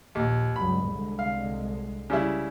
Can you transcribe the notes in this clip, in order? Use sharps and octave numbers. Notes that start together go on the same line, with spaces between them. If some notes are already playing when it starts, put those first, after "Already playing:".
A#1 D#2
C#2 G2 F#3 B5
C2 D3 G#3
F5
C#3 G3 E4